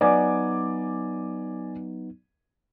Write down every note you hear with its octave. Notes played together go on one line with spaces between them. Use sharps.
F#3 B3 D#4 D5 G#5 D6